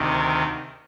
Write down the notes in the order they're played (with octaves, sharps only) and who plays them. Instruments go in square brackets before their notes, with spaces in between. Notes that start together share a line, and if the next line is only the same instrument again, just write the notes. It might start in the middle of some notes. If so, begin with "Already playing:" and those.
Already playing: [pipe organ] D2 C3 D#3